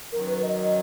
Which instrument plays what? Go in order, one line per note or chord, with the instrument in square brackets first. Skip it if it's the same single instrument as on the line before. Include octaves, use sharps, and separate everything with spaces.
[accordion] F#2 D#3 F#3 [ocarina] A#4
[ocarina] B4
D#5
D#5